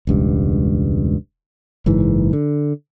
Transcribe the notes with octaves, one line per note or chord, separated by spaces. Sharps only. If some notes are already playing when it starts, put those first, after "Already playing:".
E1 C#2 G2
F#1 G#2 E3
D3